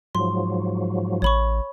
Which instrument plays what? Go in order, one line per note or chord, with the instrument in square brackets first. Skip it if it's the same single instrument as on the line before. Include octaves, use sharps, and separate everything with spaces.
[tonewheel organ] G#2 F3 F#3 [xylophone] C6
[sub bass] A1 [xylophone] C#5 B5 C#6